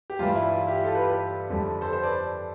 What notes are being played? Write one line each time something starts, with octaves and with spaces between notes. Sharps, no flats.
G4
G2 E3 G3 F4
E4
F4
E4 G4
F4 A4
G4 B4
B4 D5
F2 D3 G3
A4 C5
A4 C5
B4 D5